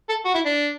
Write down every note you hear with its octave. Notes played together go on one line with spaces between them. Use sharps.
A4
F#4
E4
D4